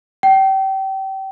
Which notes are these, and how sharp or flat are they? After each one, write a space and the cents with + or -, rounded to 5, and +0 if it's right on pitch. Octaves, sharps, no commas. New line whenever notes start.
G5 -30